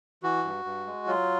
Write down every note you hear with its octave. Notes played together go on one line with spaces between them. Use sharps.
E3 F#4
G2
G2
G#3
F#3 F4